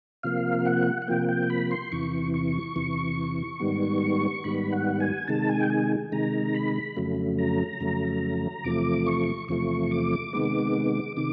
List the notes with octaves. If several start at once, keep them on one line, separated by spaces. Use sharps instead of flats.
C3 F3 A#3 F5
F#5
F#5
C3 F3 A#3 G5
G5
B5
C6
E2 C3 E3 C#6
C#6
E2 C3 E3
G#2 D#3 G3 B3
G#2 D#3 G3 B3 B5
F#5
G#5
C3 D#3 G#3 A5
G#5
G5
G#5
C3 D#3 G#3 A#5
B5
F2 C#3 F#3 A3
A#5
F2 C#3 F#3 A3
E2 C3 F3 A3 D6
C#6
E2 C3 F3 A3 C#6
D6
C3 D#3 G#3 B3
C3 D#3 D6